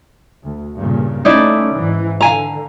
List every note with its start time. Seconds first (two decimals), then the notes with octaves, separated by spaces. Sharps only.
0.43 D2
0.78 G2 A#2 C#3
1.25 A3 C#4 D#4 E4 D5
1.73 G#2 E3
2.21 D3 F5 G#5 A#5